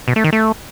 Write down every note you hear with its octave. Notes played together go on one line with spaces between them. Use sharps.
B2
A3
D#3
A3